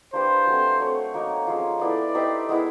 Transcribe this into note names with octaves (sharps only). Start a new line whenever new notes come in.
A#3 D4 G4 B4 C5
F#3 A3 C4
F#3 A3 C4 C#5
A#3 D#4 F#4 A#4
F3 G#3 C#4 F4
B3 E4 A4 D5
D#4 G4 C5 E5
G#3 B3 E4